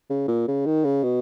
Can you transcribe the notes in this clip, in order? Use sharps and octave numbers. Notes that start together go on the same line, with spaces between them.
C#3
A#2
C#3
D#3
C#3
B2